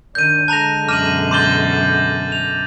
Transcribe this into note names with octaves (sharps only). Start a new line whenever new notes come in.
D#3 D4 G6 D#7
D3 G#3 A5 A#5 F#6 A#6 F7
F#2 B2 D6 F6 D#7 F#7
C6 D6 G6 A6 G7
F7